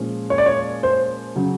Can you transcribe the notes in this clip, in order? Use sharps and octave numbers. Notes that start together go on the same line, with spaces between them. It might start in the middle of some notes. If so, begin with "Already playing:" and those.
Already playing: A#2 F3 G#3 C#4
C#5
D5
C#5
C5
C#3 F#3